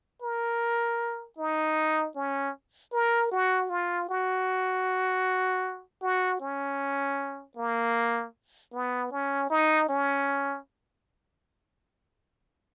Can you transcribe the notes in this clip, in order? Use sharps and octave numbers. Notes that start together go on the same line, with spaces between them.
A#4
D#4
C#4
A#4
F#4
F4
F#4
F#4
C#4
A#3
B3
C#4
D#4
C#4